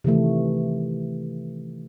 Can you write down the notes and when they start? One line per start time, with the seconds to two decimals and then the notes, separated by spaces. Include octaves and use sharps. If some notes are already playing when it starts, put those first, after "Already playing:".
0.04 C3 D#3 E3 A3